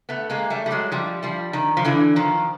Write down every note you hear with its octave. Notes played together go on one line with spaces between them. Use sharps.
A3 B3
G#3 A#3
G3 A3
G3
F#3 G#3
F3 G3
F3 G3
D#3
F3
D3 E3
D#3 F3